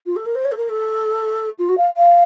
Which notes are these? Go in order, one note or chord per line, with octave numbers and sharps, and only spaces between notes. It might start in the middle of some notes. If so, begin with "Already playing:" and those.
F4
A4
A#4
C5
C#5
A4
A#4
A4
F4
F#4
F5
F5